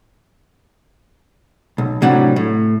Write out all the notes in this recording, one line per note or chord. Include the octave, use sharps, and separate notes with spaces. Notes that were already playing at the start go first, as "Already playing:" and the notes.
B1
A2 C3 F#3 G3 D4 F#5
A2